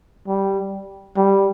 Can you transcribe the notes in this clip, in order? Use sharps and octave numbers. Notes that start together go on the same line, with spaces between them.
G3
G3